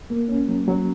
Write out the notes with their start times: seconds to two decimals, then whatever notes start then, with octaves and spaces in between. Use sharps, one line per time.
0.10 A#3
0.28 C#4
0.48 F#3
0.68 F#3